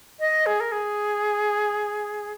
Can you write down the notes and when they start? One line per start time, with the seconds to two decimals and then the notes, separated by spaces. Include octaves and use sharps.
0.20 D#5
0.46 G#4
0.60 A#4
0.72 G#4